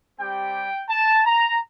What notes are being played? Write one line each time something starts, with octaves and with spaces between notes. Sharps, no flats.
G3 C4 G4 G5
A5
A#5